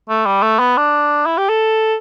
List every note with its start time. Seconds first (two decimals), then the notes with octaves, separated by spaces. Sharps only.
0.09 A3
0.26 G3
0.42 A3
0.59 B3
0.77 D4
1.26 E4
1.37 G4
1.49 A4